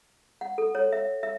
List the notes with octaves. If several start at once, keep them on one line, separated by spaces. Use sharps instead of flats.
F#5
A4
C#5
E5
E5